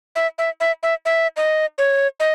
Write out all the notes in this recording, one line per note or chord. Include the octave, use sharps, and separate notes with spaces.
E5
E5
E5
E5
E5
D#5
C#5
D#5